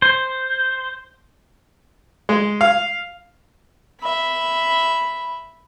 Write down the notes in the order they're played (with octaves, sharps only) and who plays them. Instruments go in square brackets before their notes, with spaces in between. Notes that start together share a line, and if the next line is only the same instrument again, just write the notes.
[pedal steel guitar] C5
[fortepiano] G#3
F5
[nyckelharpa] E5 B5